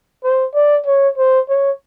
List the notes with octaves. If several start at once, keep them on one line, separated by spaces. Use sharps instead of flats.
C5
D5
C#5
C5
C#5